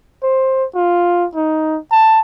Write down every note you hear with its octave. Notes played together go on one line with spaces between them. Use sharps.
C5
F4
D#4
A5